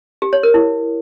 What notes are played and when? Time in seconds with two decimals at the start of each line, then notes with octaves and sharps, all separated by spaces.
0.22 G4
0.33 C#5
0.43 A#4
0.54 E4